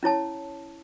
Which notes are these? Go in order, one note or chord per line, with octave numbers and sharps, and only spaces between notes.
C#4 E4 C#5 A5